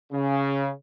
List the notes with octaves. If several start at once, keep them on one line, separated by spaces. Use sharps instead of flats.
C#3